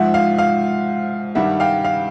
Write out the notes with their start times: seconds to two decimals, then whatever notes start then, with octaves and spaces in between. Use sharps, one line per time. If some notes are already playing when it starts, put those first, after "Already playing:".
Already playing: G#2 F3 E5 F#5
0.14 F5
0.38 F5
1.35 G2 D#3 G3 E5 F#5
1.60 F5 G5
1.84 F5